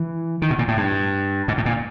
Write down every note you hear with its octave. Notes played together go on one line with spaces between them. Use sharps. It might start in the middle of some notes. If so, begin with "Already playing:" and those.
Already playing: E3
D#3
B2
A#2
A2
G2
G#2
A2
A#2